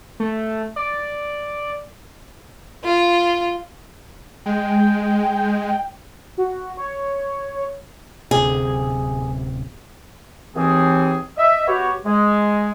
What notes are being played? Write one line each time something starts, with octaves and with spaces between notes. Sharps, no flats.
A3
D5
F4
G#3 G5
F#4
C#5
D1 C3 G#4
D#2 E3 C4 G#4
D#5 E5
B3 F#4 G4 C#5
G#3